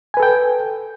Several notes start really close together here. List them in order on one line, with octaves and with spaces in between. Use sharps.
G#5 B4 A4 G5